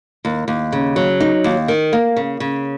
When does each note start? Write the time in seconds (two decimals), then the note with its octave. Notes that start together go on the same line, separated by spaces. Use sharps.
0.25 D#2
0.48 D#2
0.72 C#3
0.96 F#3
1.20 D#4
1.44 D#2
1.68 D#3
1.93 A#3
2.16 C#3
2.40 C#3